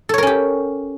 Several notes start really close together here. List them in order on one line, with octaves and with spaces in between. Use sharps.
A4 C#5 A#4 C#4 G4